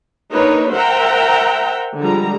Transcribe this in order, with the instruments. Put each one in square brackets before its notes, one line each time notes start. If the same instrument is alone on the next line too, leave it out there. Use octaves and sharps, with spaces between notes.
[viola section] A#3 D4 D#4 A#4 B4 C#5
A#4 C5 E5 F#5 G5 A#5
D3 F3 G3 G#3 A#5